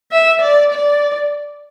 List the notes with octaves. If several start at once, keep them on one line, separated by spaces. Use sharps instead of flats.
E5
D5
D5